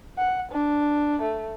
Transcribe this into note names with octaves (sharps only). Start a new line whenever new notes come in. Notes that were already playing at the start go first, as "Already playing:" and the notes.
F#5
D4
A3